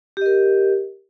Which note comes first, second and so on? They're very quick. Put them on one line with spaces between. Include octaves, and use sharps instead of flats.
G4 D#5 A#4